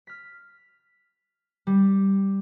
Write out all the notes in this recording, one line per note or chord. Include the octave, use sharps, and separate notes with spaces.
F6 B6
G3